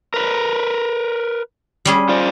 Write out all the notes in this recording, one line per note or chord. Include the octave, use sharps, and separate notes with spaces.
A#4 B4
G3 C#4 G#4
F4 C5 D5